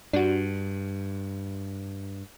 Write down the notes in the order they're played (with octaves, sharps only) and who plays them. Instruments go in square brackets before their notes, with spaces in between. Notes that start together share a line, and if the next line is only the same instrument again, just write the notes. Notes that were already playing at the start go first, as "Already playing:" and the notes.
[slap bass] G2 [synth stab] D4 F#4